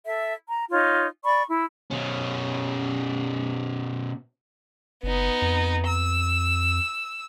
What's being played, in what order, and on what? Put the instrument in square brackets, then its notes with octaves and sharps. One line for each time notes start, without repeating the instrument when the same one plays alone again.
[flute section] A4 E5
A#5
D#4 F4 C#5
D5 B5 C#6
E4
[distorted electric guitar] B2 C#4
[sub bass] F#1 [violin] B3 D#4
[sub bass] F2
[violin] E6